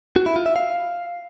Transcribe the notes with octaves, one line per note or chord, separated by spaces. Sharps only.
F#4
E4
F4
E5
F5